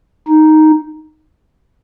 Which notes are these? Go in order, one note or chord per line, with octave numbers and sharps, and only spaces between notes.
D#4